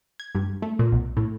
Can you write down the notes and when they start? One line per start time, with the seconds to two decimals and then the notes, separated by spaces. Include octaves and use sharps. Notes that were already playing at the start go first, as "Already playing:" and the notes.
0.20 G#6
0.35 G2
0.62 A3
0.79 A#2
0.92 B1
1.17 A2